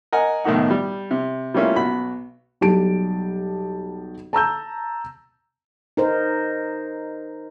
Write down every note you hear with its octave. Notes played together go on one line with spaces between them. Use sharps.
A#4 D#5 F#5 G#5
B1 A2 D#3 D#4 F#5
G3
C3
G3 A3 A#3 C#4 E4 F4
B1 F#4 B5
B1 G3 G4 A5 D7
A5 A#5 E6 G6
D#4 A#4 C5